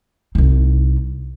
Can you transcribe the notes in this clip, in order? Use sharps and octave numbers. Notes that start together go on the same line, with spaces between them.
C2 D#4